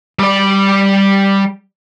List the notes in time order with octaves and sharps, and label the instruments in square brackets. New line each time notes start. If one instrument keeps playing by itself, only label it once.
[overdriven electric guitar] G3 D5